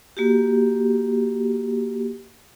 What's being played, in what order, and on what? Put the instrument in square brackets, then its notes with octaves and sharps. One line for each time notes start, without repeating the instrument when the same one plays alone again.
[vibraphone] A#3 F#4 G4